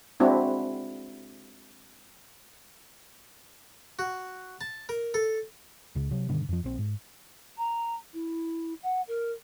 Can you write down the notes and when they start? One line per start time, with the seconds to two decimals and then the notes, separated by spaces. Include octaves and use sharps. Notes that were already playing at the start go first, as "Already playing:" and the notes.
0.20 G#3 C4 D4 E4 F#4
3.99 F#4
4.61 A5
4.89 A#4
5.14 A4
5.95 C#2 C#3
6.11 C3 F#3
6.29 G2 B2 D3 D#3
6.49 F2 F3
6.64 A#1 C4
6.79 G#2
7.58 A#5
8.13 E4
8.83 F#5
9.08 A#4